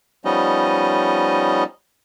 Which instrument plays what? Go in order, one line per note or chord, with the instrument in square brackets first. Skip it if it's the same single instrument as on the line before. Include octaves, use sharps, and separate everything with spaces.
[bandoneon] F3 G3 B3 C#4 D#4 D#5